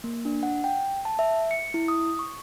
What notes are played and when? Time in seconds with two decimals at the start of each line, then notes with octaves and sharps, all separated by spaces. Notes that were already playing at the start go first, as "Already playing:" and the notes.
0.04 A#3
0.25 D4
0.43 F#5
0.64 G5
1.05 A5
1.19 E5
1.51 C#7
1.74 E4
1.88 D#6
2.19 C#6